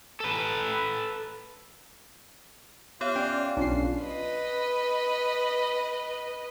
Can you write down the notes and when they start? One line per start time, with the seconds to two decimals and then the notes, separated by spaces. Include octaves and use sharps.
0.20 A4 B4
3.01 B3 F4 G4 C#5
3.16 C#4 D5 G5
3.57 B1 C#4 D4 F4 C7
4.03 B4 D#5